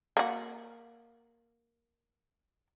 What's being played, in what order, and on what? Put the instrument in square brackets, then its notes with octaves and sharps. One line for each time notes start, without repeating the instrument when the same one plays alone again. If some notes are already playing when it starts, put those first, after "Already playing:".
[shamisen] A#3 F#4